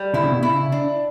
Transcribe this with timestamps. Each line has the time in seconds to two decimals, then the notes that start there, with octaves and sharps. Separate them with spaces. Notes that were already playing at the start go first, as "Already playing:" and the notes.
Already playing: G3
0.14 D3 E4
0.23 C#3
0.31 B2
0.40 C#3 E4
0.72 D4